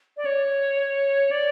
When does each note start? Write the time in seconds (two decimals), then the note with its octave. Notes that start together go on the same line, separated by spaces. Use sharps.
0.17 D5
0.25 C#5
1.31 D5